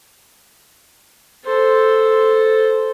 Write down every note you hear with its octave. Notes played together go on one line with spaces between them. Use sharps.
A4 C5